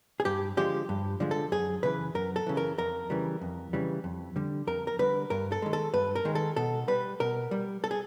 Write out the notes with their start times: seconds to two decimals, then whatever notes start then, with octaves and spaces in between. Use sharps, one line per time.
0.20 G#4
0.25 G2 G4
0.57 D3 F3 G#3 G4
0.89 G2
1.20 D3 F3 G#3
1.31 A4
1.52 F#2 G#4
1.83 C#3 E3 B4
2.15 F#2 A#4
2.36 A4
2.46 C#3 E3
2.57 A#4
2.78 F2 A#4
3.10 C#3 E3 G3
3.41 F2
3.73 C#3 E3 G3
4.04 F2
4.36 D3 G3
4.67 F2 A#4
4.87 A#4
4.99 D3 G3 B4
5.30 G2 A#4
5.52 A4
5.62 D#3 G#3
5.73 A4
5.94 G2 B4
6.15 A#4
6.25 D#3 G#3
6.35 A4
6.56 B2 A4
6.88 G3 B4
7.20 B2 A#4
7.51 G3
7.84 A4
7.91 G#4